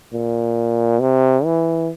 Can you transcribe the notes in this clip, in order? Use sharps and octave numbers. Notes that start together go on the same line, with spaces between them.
A#2
C3
E3